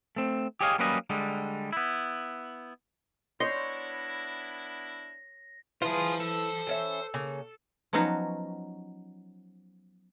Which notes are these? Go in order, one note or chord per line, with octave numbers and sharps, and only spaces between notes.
A3 C4
G4 G#4 C#5 D#5 F5
F#3 G3 A#3 C#4 B4 D#5
D3 G3 G#3
B3 E4
B3 D4 E4 C#5 D#5 C6 G6 A#6
E4 F4 G#4 B4 C5 A5
A4
E3 C#4 E5
C#3 A#3
F3 F#3 B3 C#4 D#4 F#4